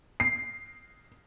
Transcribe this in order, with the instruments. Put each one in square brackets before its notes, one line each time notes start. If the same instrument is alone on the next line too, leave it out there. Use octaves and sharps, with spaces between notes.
[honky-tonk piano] C7